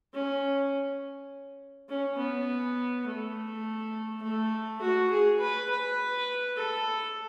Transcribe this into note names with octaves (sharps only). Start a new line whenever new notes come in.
C#4
C#4
B3
A3
A3
F#4
G#4
B4
B4
A4